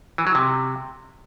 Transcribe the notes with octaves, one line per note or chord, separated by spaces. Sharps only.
E3
F#3
C3